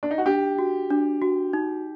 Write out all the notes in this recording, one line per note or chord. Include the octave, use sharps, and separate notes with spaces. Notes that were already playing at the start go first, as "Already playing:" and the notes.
D4
D#4
F#4
D4 G4
F#4
D4
F#4
D#4